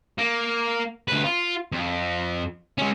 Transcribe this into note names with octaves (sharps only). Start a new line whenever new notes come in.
A#3
D2 B4
F4
F2
G#3 C#4